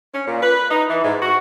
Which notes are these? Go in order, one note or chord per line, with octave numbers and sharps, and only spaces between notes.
C#4
A#2
B4
D#4
E3
G#2
F#4